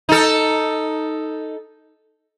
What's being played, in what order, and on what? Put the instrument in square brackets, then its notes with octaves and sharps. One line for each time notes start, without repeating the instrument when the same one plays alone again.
[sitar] D#4 A4